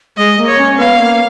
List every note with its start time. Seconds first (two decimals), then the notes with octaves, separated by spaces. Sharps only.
0.17 G#3 D#5
0.38 A#3
0.48 C#5
0.58 C#4
0.78 B3 F5
0.98 A#3